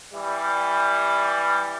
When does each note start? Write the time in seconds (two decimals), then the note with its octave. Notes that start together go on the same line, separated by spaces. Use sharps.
0.13 E3 G3